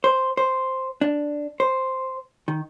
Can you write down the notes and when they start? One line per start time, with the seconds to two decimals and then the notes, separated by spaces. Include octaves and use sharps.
0.04 C5
0.37 C5
1.01 D4
1.60 C5
2.48 D#3